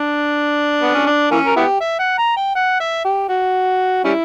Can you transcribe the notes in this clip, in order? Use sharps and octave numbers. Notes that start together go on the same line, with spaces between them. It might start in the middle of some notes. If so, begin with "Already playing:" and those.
Already playing: D4
B3
C#4
D4
E3 A#3 C#4
A#4
B3 E4 G4
E5
F#5
A#5
G5
F#5
E5
G4
F#4
G3 C#4 E4